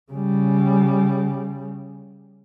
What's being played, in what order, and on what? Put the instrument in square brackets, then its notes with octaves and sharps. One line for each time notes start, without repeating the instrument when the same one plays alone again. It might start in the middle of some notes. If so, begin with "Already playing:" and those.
[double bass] C#3 G3